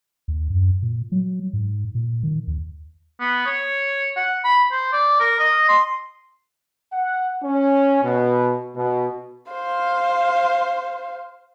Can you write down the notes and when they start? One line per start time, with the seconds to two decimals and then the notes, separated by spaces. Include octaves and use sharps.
0.28 D#2
0.50 F#2
0.82 A#2
1.12 F#3
1.53 G#2
1.95 A#2
2.23 D#3
2.47 D#2
3.20 B3
3.46 C#5
4.17 F#5
4.44 B5
4.71 C5
4.92 D5
5.20 A#4
5.39 D#5
5.69 C6
6.93 F#5
7.43 C#4
8.02 B2
8.77 B2
9.52 C5 F5